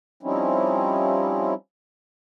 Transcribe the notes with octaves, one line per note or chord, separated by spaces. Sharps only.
F3 G3 C4 C#4 D#4 E4